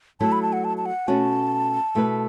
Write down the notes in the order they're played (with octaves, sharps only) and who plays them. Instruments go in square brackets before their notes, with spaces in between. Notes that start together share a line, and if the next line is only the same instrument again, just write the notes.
[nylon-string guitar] F#3 A3 E4 [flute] A5
[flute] B5
A5
F#5
A5
A5
F#5
[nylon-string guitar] B2 A3 C#4 F#4 [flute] A5
[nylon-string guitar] B2 A3 E4 B4